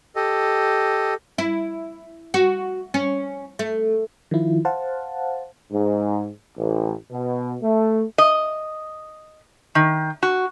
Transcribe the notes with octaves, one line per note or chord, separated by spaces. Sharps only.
G4 A4 D#5
E4
F#4
C#4
A3
D#3 F3 E4 F4
C5 F5 F#5 A5
G#2
A1
B2
A3
D#5
D#3
F#4